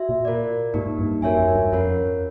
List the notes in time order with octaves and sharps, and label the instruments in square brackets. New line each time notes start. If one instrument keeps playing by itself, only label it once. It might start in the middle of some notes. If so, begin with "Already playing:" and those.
Already playing: [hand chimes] F#4 E5
[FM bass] A#2
[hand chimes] F4 A#4 D5
[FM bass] G#2 [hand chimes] A#3 D#4 G4
[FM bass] G2
[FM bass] F#2 [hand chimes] F#4 A#4 C#5 E5 G#5
[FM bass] F2
G2
[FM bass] F2 [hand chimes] C#4 F4 A#4 C#5 F#5